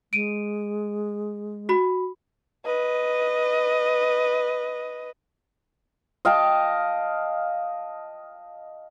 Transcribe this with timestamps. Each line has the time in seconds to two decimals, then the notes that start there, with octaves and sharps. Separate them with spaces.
0.13 G#3 D7 D#7
1.69 F#4 B5
2.66 B4 D#5
6.25 D#5 F5 G5 A5